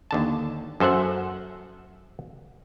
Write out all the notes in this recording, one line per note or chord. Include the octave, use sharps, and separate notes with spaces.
D#2 D3 A5
F#2 A4 C5 E5 F#5